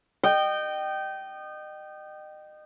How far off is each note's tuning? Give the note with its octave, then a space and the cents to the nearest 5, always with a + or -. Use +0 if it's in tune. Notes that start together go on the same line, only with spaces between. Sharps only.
D#5 -30 G5 -20